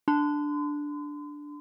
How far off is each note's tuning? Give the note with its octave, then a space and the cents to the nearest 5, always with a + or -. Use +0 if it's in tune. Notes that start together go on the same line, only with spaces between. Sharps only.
D4 +0 C6 -40